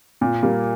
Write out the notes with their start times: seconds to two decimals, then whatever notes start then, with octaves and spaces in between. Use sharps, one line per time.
0.21 A#2
0.43 G3 A#3